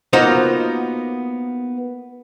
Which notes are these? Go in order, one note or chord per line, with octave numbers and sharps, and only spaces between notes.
A#3 B3 D#4 F4 F#4 C5